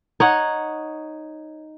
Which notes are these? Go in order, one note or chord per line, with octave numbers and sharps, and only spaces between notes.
D#4 C#5 F#5